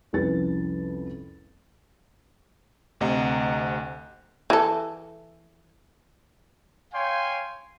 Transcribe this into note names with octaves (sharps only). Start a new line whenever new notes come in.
C2 F2 C#4 B4 A6
D2 C3 D#5 F#5 A#5
E3 A4
C#5 F5 G5 G#5 C6